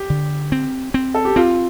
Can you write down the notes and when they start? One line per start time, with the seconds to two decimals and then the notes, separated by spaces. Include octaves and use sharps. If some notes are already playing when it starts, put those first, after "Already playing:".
Already playing: G4
0.10 D3
0.52 C4
0.94 C4
1.14 A4
1.25 G4
1.36 C4 F4